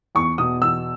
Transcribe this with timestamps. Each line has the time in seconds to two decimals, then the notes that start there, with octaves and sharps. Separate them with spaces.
0.15 E2 C#6
0.38 B2 D#6
0.62 E2 E6